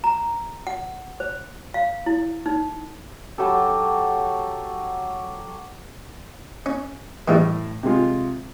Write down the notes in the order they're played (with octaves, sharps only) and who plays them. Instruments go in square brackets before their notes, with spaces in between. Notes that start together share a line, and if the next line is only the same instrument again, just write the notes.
[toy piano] A#5
F#5
C5
F5
E4
D#4
[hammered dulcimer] F#3 G4 A4
[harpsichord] C#4
[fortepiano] A2 [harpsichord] D#3 E3 G3
[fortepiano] C3 G#3 F4